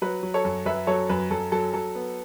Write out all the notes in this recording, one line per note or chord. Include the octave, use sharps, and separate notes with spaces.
F#3 B4
F#3
A4 C#5
F#2
F#2 B4 E5
F#3 A4 C#5
F#2 B4
F#2 A4
F#3 A4
F#3 A4
B3